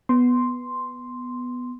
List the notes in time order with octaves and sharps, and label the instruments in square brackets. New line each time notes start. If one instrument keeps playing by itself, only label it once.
[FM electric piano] B3 C6